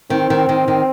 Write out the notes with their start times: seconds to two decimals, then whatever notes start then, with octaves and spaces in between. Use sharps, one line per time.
0.10 D#3 C4
0.30 D#3
0.49 D#3
0.68 D#3